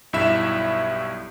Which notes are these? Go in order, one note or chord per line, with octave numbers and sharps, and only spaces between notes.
B1 G2 E4 E5 E7